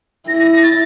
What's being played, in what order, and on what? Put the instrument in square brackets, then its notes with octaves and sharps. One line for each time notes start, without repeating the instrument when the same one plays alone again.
[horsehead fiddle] E4 [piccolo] A#6
[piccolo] A#6
A#6
A6